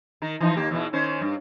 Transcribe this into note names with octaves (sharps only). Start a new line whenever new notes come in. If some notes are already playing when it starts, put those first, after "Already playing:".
D#3 A#4
E3 F3 D#4
D#2 A#3 G4
E2 B2 E3
D#3 C#4 C5
G2